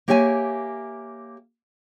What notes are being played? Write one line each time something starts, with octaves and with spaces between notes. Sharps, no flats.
A#3 G4 C#5 E5 G5 G#5